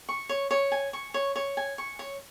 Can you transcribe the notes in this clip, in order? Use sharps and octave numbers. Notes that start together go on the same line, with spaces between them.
C#6
C#5
C#5
G#5
C#6
C#5
C#5
G#5
C#6
C#5